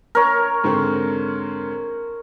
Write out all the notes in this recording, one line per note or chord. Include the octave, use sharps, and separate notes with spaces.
A#4 C#5
G#2 D3 C4